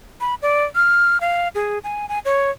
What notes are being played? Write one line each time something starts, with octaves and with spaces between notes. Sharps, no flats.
B5
D5
F6
F5
G#4
G#5
G#5
C#5